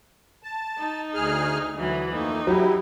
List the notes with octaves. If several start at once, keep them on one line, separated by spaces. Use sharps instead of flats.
A5
D#4
D2 G#4 F6
D2 E3 F#3
F2 A3 A#3 D#4
F#3 E4 G4